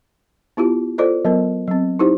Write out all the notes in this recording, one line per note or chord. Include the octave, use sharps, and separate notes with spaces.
B3 E4 F4 G4
F4 A4 C5 D5 D#5
F#3 B3 A#4
F#3 C4
D#4 E4 G4 C5